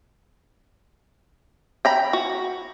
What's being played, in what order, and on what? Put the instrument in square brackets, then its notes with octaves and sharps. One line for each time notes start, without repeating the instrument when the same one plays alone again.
[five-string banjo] G5 A#5 B5
F#4